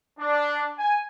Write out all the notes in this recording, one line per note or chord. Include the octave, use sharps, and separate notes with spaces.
D4
G#5